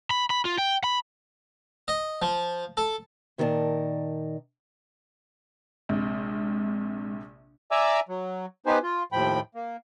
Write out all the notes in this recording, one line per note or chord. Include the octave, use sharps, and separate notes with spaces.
B5
B5
F4
G5
B5
D#5
F3
A4
A#2 D#3 A#4 C5 D5 A5
A#1 C3 G#3
D5 E5 G#5 A#5 D6 E6
F#3
B3 D#4 G4 B4 C5 G#5
F4
D#2 A2 F3 G5 B5
A#3